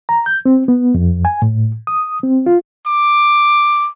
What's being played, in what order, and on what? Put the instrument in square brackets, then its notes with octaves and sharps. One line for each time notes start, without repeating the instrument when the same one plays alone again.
[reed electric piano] A#5
G6
C4
B3
F2
G#5
A2
D#6
C4
F4
[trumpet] D6